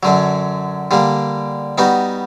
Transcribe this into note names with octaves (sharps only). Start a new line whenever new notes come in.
F#2 D3 F#3
D3 G3 A#3
G3 B3 D#4 F#4